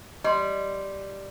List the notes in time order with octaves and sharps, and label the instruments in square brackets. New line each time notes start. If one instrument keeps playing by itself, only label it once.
[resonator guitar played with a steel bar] G3 [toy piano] D#5 C6